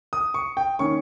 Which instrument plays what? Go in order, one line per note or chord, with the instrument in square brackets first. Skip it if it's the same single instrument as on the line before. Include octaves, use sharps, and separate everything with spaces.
[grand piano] D#6
C#6
G5
D#3 A#3 C#4 C#6